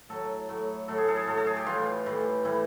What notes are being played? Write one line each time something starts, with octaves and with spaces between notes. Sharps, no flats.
A2 F#3 A4
A2 F#3
A2 F#3 A4
G#4
A4
G#4
A2 F#3 A4
A4
G#4
G4
A2 E3 G3 F4
A2 E3 G3
A2 E3 G3 E4